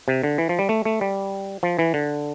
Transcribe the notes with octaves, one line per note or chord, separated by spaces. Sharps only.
C3
D3
E3
F3
G3
A3
A3
G3
F3
E3
D3